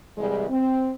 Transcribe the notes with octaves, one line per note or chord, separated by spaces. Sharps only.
C2 E3 G3 G#3
C4